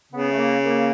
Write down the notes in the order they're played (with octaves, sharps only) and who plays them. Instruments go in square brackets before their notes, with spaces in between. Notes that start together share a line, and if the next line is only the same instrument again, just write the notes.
[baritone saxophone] C#3 [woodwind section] B3
[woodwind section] A3
A#3
A#3